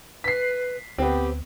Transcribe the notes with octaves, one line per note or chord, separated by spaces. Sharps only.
B4 B6 C7
D2 B3 C4 G4